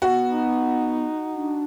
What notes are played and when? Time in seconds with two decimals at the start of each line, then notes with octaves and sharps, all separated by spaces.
0.02 B3 F#4
0.30 D#4
1.35 D4